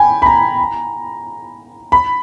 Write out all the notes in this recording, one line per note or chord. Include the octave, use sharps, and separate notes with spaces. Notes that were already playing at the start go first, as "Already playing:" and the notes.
Already playing: G5 G#5 B5
B5
A#5
B5